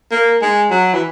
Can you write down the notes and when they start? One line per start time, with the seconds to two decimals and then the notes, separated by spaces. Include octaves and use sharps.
0.12 A#3
0.42 G#3
0.71 F#3
0.94 E3